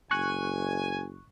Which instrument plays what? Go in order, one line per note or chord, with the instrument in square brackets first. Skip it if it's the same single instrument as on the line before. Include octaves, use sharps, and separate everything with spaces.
[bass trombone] F#1 [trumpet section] G#5 [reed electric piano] C#6 F#6